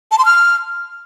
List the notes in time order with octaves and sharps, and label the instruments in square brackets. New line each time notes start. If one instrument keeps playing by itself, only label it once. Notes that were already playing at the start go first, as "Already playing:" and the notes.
[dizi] A5
C6
F6